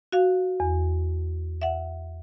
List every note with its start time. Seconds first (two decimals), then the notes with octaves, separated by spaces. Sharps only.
0.12 F#4 F5
0.60 E2
1.62 E5 F#5